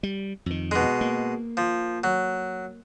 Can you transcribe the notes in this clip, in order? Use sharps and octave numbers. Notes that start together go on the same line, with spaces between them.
G3
F2 D#3
B2 G#3
A#3
F3
F#3